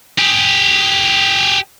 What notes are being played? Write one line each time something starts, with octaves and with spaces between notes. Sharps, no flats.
G4 G#4